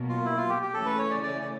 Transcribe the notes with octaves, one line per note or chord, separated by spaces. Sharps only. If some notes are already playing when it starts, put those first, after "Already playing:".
Already playing: B2 F#3 A#3
F4
E4
F4
G4
G4
C#3 E3 A3 C#4 A4
B4
C#5
D5
D5
D5